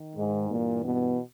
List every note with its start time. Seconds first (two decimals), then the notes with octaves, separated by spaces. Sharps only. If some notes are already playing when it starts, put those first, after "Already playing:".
Already playing: D#3
0.15 G#2 G#3
0.48 G2 A#2 E3 A#3
0.82 B2 B3